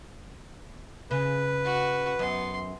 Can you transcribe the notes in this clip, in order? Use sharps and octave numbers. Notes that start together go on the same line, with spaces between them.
C#3 B4
F#4
F#2 B3 C6